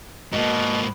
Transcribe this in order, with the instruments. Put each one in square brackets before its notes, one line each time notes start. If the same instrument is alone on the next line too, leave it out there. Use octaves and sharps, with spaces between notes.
[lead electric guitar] G#2 A#3 [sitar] B2